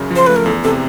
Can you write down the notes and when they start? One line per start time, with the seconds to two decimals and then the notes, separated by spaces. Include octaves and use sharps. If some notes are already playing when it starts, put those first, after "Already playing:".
Already playing: F#2 C#3 C#4
0.10 F3
0.16 C5
0.26 A3 B4
0.36 A#4
0.46 E2 A4
0.64 C3 A4